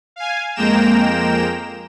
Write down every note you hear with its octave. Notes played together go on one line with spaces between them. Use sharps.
F5 G#5
F2 G#3 A#3 G5 A#5 E7